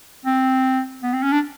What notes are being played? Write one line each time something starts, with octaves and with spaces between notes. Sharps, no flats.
C4
B3
C4
C#4
D4